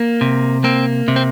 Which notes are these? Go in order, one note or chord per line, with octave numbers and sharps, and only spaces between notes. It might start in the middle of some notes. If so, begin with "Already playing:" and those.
Already playing: A#3
C3
A#3 C4
C3
C4